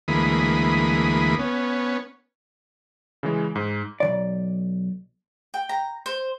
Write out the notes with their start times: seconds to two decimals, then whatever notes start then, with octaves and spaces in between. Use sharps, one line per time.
0.08 D2 E3 G#3 A#3 B5 D#6
1.39 B3 C#4
3.23 C#3 E3 G#3
3.56 G#2
4.00 B1 C3 D5
5.54 G5
5.69 A#5
6.06 C5